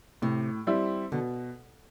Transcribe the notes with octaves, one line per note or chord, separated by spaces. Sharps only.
A2 C3
G3 C4 E4
B2 D3